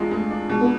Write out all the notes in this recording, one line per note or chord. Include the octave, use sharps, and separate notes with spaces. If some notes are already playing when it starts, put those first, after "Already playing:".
Already playing: E2 G#3 D4 F4
G#3 A3
D4
B2 G#3
B3